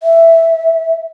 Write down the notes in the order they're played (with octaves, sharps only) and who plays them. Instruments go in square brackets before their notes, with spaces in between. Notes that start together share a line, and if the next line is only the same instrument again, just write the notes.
[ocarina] E5